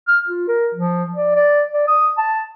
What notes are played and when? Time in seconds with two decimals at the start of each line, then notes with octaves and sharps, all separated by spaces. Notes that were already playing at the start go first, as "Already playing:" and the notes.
0.08 F6
0.27 F4
0.48 A#4
0.75 F3
1.15 D5
1.35 D5
1.73 D5
1.88 D#6
2.17 A5